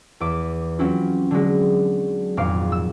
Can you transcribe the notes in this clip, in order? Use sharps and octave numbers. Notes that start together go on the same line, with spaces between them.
E2 E5 D6
F#3 C4 C#4 E4 F4
D3 F#3 G#3
G#1 F2 A#2 F4 F5 D6
E6